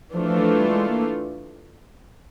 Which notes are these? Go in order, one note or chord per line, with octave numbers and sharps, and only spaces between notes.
E3 F3 A3 D4 F4
F3
F3
G3
G#3
A#3